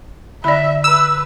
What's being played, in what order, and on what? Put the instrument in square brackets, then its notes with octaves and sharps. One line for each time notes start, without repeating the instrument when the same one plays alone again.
[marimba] D3 E4 [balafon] D5 B5 [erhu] E5
[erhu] B4 [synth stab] E6